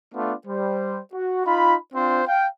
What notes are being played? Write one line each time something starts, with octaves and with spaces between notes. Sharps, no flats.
A3 B3 D4 F4
G3 C5
F#4
D#4 F4 B5
C4 D4 F4 C5
F5 G5